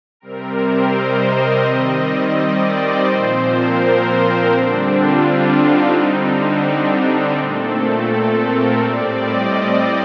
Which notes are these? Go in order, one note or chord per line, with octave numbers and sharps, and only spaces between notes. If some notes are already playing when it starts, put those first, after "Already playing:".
C3 G3 C4 A#4
C5
D#5
D#3 G3 C4 D#5
D5
C5
A#2 F3 C4
A#4
D3 G3 C4 D4
F4
D#4
D3 G3 C4
D4
D#4
A#2 A3 C4 A4
A4
A#4
A2 G3 C4 D5
D#5